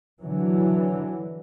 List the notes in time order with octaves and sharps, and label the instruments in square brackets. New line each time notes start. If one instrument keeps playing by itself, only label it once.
[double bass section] D3 E3 F#3